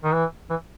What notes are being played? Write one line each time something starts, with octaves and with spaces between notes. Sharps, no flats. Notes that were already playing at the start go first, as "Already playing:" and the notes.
D#3
E3
E3